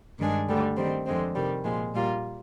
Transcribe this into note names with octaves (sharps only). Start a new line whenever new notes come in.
G2 D#3 G#3 D4 G#4
D2 D3 G3
D#3 G3 C4
F2 D3 G#3 C4
C3 D#3 G3
A#2 F3 G#3
A#2 G3 A#3 F4